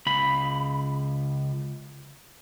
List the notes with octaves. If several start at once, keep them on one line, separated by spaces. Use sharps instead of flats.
C#2 B5